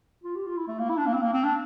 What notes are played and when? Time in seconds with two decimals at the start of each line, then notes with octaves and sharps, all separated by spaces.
0.24 F4
0.35 G4
0.46 F4
0.57 E4
0.68 A3
0.79 A#3
0.89 E4
0.98 D4
1.06 A#3
1.14 C4
1.22 A#3
1.33 C4
1.44 D4